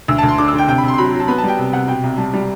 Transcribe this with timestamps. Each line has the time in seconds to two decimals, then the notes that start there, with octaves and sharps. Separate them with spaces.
0.08 D2 E6
0.18 D2 A5
0.29 C6
0.38 D3 D6
0.48 E6
0.53 D3 G5
0.68 C3 G5
0.78 B5
0.83 C3 C6
0.94 C6
0.98 F#3 B5
1.13 F#3
1.20 A5
1.28 B3 B5
1.38 A5
1.43 G3 G5
1.58 C3
1.73 C3 F#5
1.88 B2 G5
2.03 C2
2.18 G3 A5
2.34 G3